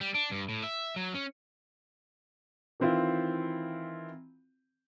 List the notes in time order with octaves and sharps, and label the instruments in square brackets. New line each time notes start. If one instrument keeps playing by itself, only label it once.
[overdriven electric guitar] G3
D4
G2
A2
E5
F#3
C#4
[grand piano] D#3 E3 C4 E4 F4